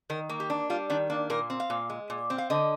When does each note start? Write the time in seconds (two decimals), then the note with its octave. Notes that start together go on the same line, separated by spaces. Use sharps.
0.10 D#3 A#4
0.29 A#3
0.40 G4
0.50 D4
0.70 G3 F4
0.90 D#3 D4
1.10 A#3 D4
1.30 A#2 A#4
1.50 C4
1.60 F5
1.70 A#2
1.90 G#3
2.10 A#2
2.30 C4
2.38 F5
2.50 D3 D#5